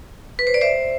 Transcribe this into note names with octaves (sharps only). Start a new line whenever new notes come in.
B4
C5
D5
C5 E5